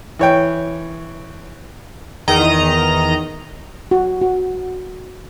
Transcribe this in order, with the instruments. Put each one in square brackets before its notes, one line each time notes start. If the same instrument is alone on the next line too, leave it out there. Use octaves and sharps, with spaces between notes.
[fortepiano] E3 C#5 G5
[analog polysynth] E2 D#3 D#5 A#5
[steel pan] F#4
F#4